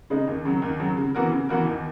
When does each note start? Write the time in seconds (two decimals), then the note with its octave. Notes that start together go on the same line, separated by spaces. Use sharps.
0.10 C#3 G#3 D#4
0.27 D#2
0.45 C#3 F#3
0.62 D#2
0.80 C#3 F#3
0.97 C#3
1.15 E3 B3 F#4 A#4
1.32 C#3
1.49 E3 B3 F#4 A#4
1.66 D#2